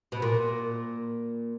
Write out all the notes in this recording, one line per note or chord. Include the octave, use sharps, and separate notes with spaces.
B2
A#2